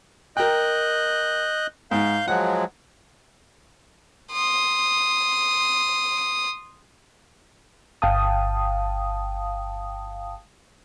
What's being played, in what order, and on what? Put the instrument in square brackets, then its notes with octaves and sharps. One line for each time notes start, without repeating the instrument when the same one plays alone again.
[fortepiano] A#4 G5 [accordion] D#5 F#6 G6
[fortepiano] G#2 [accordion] F5 G6
[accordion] F3 F#3 G#3 [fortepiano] F#5
[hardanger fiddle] C6 D#6
[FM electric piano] G1 F5 G5 A5 D#6